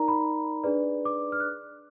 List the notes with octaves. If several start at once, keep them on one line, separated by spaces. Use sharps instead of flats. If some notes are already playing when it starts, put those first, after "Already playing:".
Already playing: D#4 A#4 D5 A#5
B5
D4 G#4 B4 D5
D6
F6
F#6